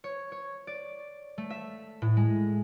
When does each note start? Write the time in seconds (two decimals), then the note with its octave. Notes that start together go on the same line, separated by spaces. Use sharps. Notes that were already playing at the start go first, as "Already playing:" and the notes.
0.04 C#5
0.32 C#5
0.67 D5
1.38 A3
1.50 E5
2.02 A2
2.17 G#3